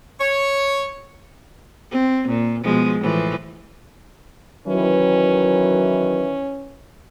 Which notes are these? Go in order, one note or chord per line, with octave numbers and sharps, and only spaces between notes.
C#5
C4
A#2
B2 F3 G#3
A2 E3 F3
D#3 E3 F#3 C#4 B4